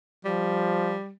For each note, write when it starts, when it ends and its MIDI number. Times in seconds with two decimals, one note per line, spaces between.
0.25 0.98 53
0.25 1.11 55